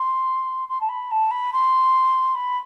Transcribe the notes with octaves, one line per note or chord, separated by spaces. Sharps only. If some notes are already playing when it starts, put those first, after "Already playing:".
Already playing: C6
C6
A5
B5
A5
B5
C6
B5